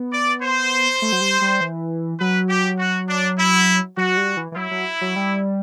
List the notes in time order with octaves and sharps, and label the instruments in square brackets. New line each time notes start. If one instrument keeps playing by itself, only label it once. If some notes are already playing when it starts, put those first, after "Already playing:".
Already playing: [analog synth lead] B3
[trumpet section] D5
C5
[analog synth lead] A3
F#3
G3
G3
E3
[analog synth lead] F#3 [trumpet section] B4
[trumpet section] G4
F#4
D4
E4
[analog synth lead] F#3 [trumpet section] F#4
[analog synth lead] G3
E3
E3
[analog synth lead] F#3 [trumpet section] E4
[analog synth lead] F#3
F#3
G3